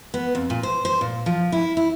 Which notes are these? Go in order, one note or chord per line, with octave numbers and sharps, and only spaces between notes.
B3
F2
A#2
C5
C5
A#2
F3
E4
E4